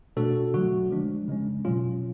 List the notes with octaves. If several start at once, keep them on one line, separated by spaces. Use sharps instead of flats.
B2 A3 D4 F#4 A4
D3 F#3 A3 F#4
F3 G#3 D4
C#3 G#3 C#4
B2 F#3 C#4 F4